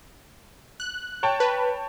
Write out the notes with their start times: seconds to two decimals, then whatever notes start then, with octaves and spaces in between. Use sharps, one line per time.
0.80 F#6
1.23 C#5 G5 A5
1.40 B4